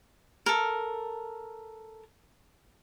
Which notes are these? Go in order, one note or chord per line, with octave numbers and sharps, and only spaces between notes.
A4 A#4